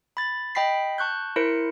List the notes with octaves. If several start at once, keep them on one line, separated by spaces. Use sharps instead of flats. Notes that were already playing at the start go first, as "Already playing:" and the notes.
B5 A6
D#5 G5 B5 B6 C7
A5 C#6 F#6 G6
E4 A#4 C5 C#7